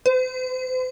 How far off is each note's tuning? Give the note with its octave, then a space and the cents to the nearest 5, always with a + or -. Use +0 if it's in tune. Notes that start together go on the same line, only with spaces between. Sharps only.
C5 -40